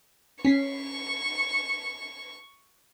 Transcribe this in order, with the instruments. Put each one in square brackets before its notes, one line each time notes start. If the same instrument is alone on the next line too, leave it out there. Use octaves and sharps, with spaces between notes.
[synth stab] C#4 B6 C7 [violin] C#6